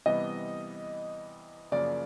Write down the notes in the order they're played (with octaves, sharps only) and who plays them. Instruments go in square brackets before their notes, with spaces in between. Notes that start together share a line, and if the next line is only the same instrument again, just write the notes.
[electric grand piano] C3 E3 G3 B3 [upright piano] D#5
[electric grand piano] F#2 C#3 F3 A#3 [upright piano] D5